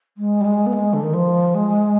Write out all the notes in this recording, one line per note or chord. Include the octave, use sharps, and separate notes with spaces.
G#3
G3
G#3
B3
G#3
D3
D#3
F3
G#3